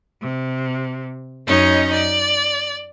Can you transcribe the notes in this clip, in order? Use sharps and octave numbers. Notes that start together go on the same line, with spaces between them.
C3
F#2 C#4 D#4 C#5 D#5
D5